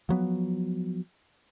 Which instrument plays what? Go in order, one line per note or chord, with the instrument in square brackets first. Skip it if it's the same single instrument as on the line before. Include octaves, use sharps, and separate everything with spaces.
[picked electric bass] F3 F#3 B3